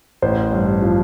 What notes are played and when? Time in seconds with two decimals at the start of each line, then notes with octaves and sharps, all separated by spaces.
0.22 A1 C5
0.53 G2
0.82 F3 F4